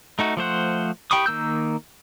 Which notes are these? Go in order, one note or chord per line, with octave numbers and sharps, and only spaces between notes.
A3 D#4 F#4
F3 A3 C5 F#5
G4 G5 B5 C#6 D#6
D#3 A#3 E6 G6